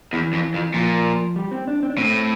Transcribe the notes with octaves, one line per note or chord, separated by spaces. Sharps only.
E2 E3
F2
F2
A#2 F3
G3
C4
D4
C4
D4
A2 C4